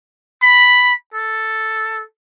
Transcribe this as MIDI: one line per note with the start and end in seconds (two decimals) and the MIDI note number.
0.43 0.93 83
1.14 2.03 69